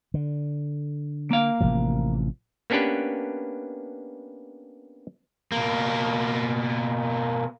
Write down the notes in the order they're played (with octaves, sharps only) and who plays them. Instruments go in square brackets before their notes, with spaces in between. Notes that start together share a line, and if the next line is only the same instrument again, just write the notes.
[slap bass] D3
[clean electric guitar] A#3 F5
[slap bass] A1 C3 F3
[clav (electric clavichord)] A#3 B3 C#4 D4 G4 B4
[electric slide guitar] B2 A#3